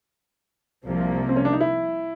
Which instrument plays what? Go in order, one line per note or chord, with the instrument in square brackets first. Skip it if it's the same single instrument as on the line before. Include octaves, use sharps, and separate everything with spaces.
[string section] C2 C3 F3 A#3
[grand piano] C4
C#4
D4
D#4
E4